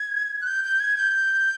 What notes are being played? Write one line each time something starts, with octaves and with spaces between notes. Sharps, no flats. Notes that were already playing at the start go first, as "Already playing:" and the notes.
Already playing: G#6
F#6
G6
G6
G#6
G6